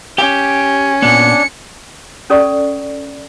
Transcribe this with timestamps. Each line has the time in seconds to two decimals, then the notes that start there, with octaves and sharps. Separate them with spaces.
0.18 C#4 G4 G5
1.02 A#2 B3 D4 C#7
2.30 C#4 A4 D5 C#6